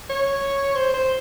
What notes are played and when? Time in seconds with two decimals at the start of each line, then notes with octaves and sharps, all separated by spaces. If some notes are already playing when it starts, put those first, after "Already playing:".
0.10 C#5
0.75 C5
0.94 C5